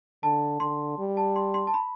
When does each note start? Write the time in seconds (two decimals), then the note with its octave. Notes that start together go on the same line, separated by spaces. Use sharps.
0.23 D3 A5
0.60 D3 C6
0.99 G3
1.17 A5
1.36 C6
1.54 C6
1.67 A5
1.74 B5